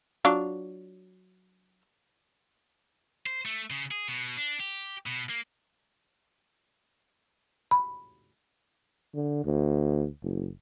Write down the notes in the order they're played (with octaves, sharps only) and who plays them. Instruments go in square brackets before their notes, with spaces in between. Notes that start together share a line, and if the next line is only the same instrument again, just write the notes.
[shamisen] F#3 D4 F4
[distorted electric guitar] C5
A3
C#3
G#4
B2
D4
G4
B2
A#3
[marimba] B5
[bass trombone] D3
D2
F#1